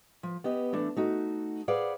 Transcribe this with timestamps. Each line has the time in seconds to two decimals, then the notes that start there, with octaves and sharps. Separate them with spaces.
0.23 F3
0.44 B3 G4 D#5
0.72 E3 A3 D4
0.97 A3 D#4 F#4
1.68 G#4 B4 C5 D5 F5 F#5